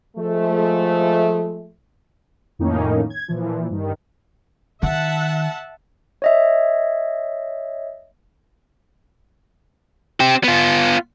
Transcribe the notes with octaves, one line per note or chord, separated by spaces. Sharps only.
F3 G#3 A3
F2 A2 D#3 A#3 C#4 D#4
G#6
A#2 E3 F3
G2 D#3
D#3 E5 F#5 A5
C#5 D#5 E5
C4 G4
B3 F4